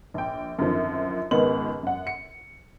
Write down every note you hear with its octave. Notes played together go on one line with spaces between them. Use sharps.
A#1 G5
F#2 D3 D#3 F3 C4
C#2 G#2 D#3 B3 F#7
F#2 F#5
C#7